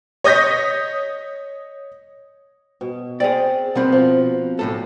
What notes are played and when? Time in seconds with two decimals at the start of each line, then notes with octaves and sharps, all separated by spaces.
0.24 C#5 D#5 D#6 G6 A#6 B6
2.81 B2
3.20 C4 G#4 D5
3.75 B2 B3 C4 A#4 B4
3.92 F3 F#4
4.59 B1 A2 A4